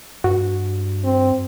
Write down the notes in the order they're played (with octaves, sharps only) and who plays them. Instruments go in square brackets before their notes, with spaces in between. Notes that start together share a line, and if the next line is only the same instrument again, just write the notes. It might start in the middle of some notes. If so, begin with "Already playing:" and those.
[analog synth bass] G2 [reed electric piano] F#4
[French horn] C4